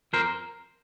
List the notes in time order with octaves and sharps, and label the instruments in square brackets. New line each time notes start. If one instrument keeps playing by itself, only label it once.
[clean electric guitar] F2 A#4 C5